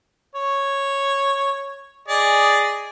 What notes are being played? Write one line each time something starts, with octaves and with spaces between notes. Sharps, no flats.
C#5
G#4 D5 D#5